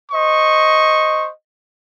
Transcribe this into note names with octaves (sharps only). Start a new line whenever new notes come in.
C5 D#5 C#6